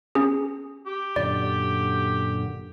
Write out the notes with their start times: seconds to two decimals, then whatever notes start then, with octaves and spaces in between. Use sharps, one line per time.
0.15 C#4 G#4
0.86 G4
1.16 F#2 A#2 D3 D5